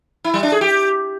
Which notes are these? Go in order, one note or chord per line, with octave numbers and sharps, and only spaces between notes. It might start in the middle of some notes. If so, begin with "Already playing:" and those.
E4
G3
D4
G#4
G4